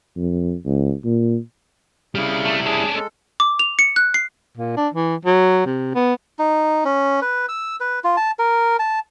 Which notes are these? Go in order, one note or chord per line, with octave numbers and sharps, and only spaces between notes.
F2
C#2
A#2
C#3 G3 E4 F6
A3
C#4 D4 G#4
G#3 A4
D6
F7
C#7
F#6
C7
A#2
D4
E3
F#3
C3
B3
D#4
C#4
B4
E6
B4
F4
A5
A#4
A5